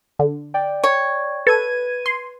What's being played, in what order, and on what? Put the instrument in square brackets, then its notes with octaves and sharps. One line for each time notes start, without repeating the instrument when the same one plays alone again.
[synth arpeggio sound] D3
[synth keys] D5 G5
[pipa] C#5
[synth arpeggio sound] A4 [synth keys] B4 G#6 D#7
[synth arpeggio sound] C6